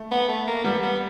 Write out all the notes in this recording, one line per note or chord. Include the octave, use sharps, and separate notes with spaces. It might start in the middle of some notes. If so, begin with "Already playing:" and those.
Already playing: A3
B3
A3
A#3
G3 B3
B3